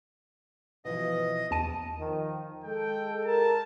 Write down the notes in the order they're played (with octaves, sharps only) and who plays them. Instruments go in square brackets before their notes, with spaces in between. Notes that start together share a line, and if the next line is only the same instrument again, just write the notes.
[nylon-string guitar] B2 E3 F3 [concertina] D#5
[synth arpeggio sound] E2 A5 D#7
[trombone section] D#3 F3
[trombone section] G#3 A4 [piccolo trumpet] G5
[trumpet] A#4 [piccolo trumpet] A5